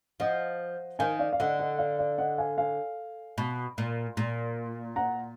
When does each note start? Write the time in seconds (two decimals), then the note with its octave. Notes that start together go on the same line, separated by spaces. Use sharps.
0.20 F3 D#5 F#5
0.99 D#3 F5 G#5
1.19 D5 F5
1.33 F5
1.40 D3 D#5 F#5
1.59 D#5 F#5
1.78 D5 F5
1.99 D5 F5
2.18 D#5 F#5
2.38 F5 G#5
2.58 F5 G#5
3.38 B2
3.78 A#2
4.17 A#2
4.96 F#5 A#5